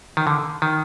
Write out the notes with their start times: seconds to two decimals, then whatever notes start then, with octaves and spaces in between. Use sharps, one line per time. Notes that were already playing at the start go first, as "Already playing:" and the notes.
0.17 D#3
0.27 D3
0.62 D#3